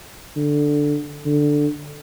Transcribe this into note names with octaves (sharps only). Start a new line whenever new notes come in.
D3
D3